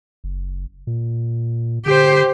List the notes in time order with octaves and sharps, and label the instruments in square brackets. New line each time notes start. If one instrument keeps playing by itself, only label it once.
[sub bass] F#1
A#2
[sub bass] D3 [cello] G4 C5